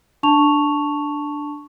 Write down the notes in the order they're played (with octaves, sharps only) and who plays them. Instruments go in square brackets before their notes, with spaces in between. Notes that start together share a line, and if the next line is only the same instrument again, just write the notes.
[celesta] D4 A5 C#6 F7